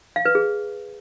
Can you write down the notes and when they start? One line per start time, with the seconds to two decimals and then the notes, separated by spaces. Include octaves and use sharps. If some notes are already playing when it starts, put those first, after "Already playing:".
0.16 F5
0.25 B4
0.35 G#4